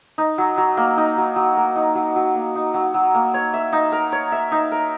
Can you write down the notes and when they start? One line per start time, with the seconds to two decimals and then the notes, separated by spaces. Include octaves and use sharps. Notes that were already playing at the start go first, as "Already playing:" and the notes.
0.18 D#4
0.38 F#3
0.58 F#3
0.77 A#3
0.97 D#4
1.17 F#3
1.36 F#3
1.57 A#3
1.76 D#4
1.95 F#3
2.16 F#3
2.35 A#3
2.55 D#4
2.74 F#3
2.94 F#3
3.15 A#3
3.34 C#5
3.54 E5
3.73 D#4
3.92 A#4
4.12 C#5
4.32 E5
4.52 D#4
4.71 A#4